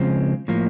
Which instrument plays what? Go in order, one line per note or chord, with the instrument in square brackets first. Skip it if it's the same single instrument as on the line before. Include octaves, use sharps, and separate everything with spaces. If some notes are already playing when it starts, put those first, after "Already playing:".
Already playing: [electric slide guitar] C#3 F3 G#3 C4
A2 F3 A#3